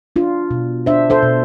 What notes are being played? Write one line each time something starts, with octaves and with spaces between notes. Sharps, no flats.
D4 F4
B2
D4 C5 E5
A4 C5
B2